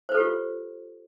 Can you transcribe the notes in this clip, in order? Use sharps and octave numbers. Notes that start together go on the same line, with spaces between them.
F4 G4 A4 B4 C5